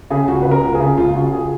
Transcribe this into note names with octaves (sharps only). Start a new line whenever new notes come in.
C#3 G#4
C#2 F#4
C#3 B4
A#4
C#2
G#4
C#3
C#2 F4
C#3 F#4
G#4